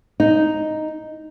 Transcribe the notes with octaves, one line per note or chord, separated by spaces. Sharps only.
D#4